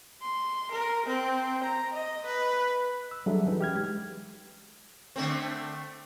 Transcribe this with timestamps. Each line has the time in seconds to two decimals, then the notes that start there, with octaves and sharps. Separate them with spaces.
0.22 C6
0.72 A#4
1.06 C4
1.64 A#5
1.93 D#5
2.26 B4
3.11 E6
3.26 F#3 G3 D4 G#4 A4 E5
3.45 E3 C#4 D#4 B4
3.61 G4 F6 G#6
3.75 G#3
5.16 D3 A3 C4